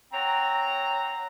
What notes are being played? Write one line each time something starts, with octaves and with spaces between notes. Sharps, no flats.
C4 C#5 F#5 A#5